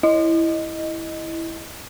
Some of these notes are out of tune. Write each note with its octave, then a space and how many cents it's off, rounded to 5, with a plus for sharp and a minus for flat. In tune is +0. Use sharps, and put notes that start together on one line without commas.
E4 +0 D#5 +0